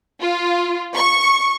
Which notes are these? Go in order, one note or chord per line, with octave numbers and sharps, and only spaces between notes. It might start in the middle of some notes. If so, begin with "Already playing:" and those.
F4
C#6